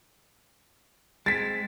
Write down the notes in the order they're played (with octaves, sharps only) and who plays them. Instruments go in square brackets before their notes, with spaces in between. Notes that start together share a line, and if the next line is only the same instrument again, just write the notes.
[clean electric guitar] G#3 C4 [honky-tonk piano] A6 B6